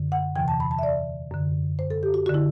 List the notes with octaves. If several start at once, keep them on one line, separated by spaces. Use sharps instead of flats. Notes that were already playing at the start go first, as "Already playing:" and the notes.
Already playing: F#2 D3
F#5
E2 C3 E3 G5
A5
B5
A5
E5
D5
F#2 D3
C5
A4
G4
F#4
F#4
D3 E4